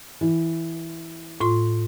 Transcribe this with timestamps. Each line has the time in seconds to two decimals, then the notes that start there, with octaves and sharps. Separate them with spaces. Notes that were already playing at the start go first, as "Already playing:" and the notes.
0.21 E3
1.41 A2 F4 C6